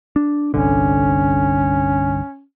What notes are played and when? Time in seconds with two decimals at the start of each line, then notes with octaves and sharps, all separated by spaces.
0.16 D4
0.54 G1 C2 D3 C#4